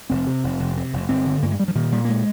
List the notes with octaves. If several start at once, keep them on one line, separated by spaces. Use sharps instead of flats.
F1 C4
C3
F1
F1
C3
F1
G1 C4
D3
G2 A#3
G#3
G2 G3
F3
A#2 D#3
A#2 G3
A#3
G#3